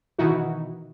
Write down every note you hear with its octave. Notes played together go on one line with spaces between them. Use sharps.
B2 D#3 E3 D#4 E4 F#4